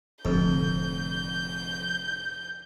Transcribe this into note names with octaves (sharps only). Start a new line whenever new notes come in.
F1 F2 A2 D3 G6